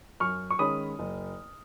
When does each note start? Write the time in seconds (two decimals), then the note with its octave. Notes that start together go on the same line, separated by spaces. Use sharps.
0.20 F#2 C#6 F6
0.50 C#6
0.59 D#3 G#3 C#4 B5 D#6
0.99 F#1